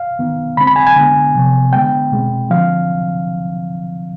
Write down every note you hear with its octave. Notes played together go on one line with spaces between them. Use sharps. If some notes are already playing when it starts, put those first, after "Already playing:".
Already playing: F5
D#3 B3
D3 G#3 C4 B5
B5
G#5
G#5
D3 G#3 B3
C3 F3 B3
D3 G#3 B3 G5
B2 G#3 C4
D3 F3 C4 F5